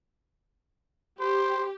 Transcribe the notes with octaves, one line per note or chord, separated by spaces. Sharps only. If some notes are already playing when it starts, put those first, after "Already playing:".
G4 C5